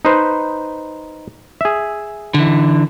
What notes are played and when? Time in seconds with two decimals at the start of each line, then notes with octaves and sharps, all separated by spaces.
0.05 D#4 B4 C5
1.61 G#4 E5
2.34 D3 E3